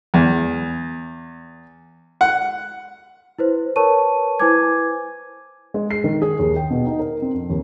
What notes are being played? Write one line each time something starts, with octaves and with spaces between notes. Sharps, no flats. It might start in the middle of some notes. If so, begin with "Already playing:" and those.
E2
F#5
E4 B4 C5
A#4 B4 C#5 A5 C#6 D#7
E4 B4 C5 G#5 D6 G#6
G#3
C7
D#3
G#4
D#2
G5
B2
D#4
A#4
C4
F2
D#2